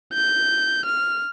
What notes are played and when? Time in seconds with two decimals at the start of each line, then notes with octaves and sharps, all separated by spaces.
0.13 G6
0.85 F6